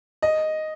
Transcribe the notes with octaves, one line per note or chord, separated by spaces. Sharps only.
D#5